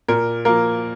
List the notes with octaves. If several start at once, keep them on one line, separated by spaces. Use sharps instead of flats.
A#2 A#4
F3 A#3 A#4